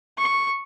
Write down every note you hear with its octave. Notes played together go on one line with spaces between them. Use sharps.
C#6